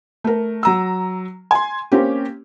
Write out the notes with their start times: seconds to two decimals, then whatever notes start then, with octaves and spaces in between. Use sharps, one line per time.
0.24 A3 A#4
0.63 F#3 A#5 E6
1.51 G#5 C6
1.92 A#3 C4 C#4 G4